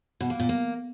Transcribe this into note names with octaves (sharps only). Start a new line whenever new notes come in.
B2
A#3
A#2
A#3